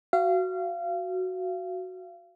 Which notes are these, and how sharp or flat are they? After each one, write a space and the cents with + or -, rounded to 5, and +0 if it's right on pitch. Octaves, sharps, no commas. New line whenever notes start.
F#4 +0 F5 -30